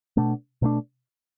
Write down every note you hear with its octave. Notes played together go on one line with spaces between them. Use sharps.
B2 A3 D4
B2 A3 D4